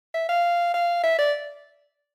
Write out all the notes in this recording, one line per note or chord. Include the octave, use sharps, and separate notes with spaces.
E5
F5
F5
E5
D5